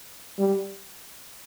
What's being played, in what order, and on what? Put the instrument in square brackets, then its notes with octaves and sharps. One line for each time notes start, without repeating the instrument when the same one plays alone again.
[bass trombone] G3